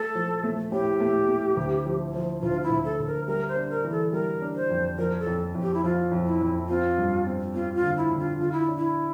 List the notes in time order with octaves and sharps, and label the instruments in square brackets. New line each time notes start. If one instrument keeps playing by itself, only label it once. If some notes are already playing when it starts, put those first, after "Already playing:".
Already playing: [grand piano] A3 [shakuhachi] A4
[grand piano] F3
A3
[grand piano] A2 [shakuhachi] G4
[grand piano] A3
A3
D2
F3
F3
[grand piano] D2 [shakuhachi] F4
[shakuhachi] E4
[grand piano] D2
[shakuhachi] A4
[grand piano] D2
[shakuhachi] A#4
[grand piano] G3 [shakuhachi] A#4
[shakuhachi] C5
[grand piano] D4
[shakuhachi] A#4
[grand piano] E3
[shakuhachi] A4
[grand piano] G3 [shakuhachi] A#4
[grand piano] D4
[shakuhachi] C5
[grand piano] F2
[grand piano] F3 [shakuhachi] A#4
[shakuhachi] A4
[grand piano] F2
F2
[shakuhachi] G4
E4
[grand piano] F3 [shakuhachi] F4
[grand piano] F2
[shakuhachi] E4
[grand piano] F2
[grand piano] C4 [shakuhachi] F4
[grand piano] G2
C4
[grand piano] C4 [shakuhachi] F4
[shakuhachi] F4
[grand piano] D3
[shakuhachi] E4
[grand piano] D3
[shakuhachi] F4
[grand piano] D3 [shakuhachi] F4
[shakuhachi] E4
[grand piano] D4
[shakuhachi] E4